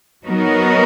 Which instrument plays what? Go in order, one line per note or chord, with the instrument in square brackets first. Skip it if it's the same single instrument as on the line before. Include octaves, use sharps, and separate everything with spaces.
[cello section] F#3 B3 D#4 F#4 A#4